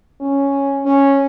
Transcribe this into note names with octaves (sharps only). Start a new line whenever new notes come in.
C#4
C#4